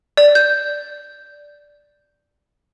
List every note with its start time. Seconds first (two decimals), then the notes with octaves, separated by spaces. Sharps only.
0.17 D5
0.35 G6